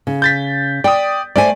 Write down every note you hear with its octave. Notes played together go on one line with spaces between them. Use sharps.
C#3
G6 A6 B6
D5 G5 D#6
A3 C5 D5 G#5